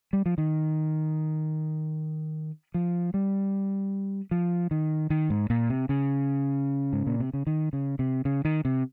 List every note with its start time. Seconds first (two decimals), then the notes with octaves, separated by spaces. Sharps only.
0.13 G3
0.26 F3
0.38 D#3
2.74 F3
3.14 G3
4.31 F3
4.71 D#3
5.10 D#3
5.30 G#2
5.50 A#2
5.70 C3
5.89 C#3
6.93 G#2
7.07 A#2
7.20 C3
7.34 C#3
7.47 D#3
7.73 C#3
7.99 C3
8.25 C#3
8.45 D#3
8.65 C3